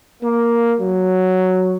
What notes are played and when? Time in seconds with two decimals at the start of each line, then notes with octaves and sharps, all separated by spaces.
0.23 A#3
0.80 F#3